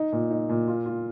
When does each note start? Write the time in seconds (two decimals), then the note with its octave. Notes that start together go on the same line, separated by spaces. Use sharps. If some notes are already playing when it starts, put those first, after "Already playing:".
Already playing: D#4
0.12 A#2
0.30 D#4
0.49 A#2
0.68 F4
0.86 F4